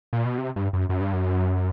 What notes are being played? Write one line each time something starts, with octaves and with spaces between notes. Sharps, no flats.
A#2
B2
C3
G2
F#2
F#2
G2
F#2